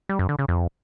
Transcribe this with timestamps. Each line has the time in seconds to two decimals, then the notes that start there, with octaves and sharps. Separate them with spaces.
0.09 G3
0.19 F#2
0.29 D3
0.39 C#3
0.48 F2